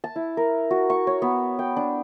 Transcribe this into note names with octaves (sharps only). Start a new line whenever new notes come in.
A5
E4
A#4
F#4
C#6
C#5
B3
G5
D4